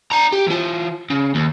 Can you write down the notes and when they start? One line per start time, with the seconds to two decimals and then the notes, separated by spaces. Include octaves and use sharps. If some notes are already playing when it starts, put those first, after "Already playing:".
0.12 D4 A#5
0.33 G4
0.47 E3 F4
1.10 C#3
1.35 D#2